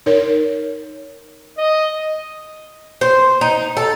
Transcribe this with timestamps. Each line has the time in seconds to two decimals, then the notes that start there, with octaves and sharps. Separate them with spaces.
0.06 D#4 A#4 C#5
1.58 D#5
3.01 C5
3.41 D#4
3.77 A4